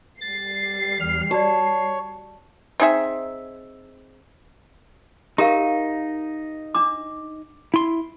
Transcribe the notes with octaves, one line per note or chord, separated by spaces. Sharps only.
G3 A6 C7
E2 F6
F#4 C#5 D5 A5
C4 D#4 G#4 E5
D#4 G4 A#4 F5
D4 D6
E4 C6